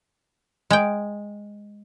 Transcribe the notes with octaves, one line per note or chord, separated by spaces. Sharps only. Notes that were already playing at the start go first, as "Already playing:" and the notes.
G#3 G5